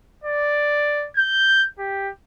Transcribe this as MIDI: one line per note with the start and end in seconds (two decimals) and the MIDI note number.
0.24 1.07 74
1.16 1.64 91
1.79 2.10 67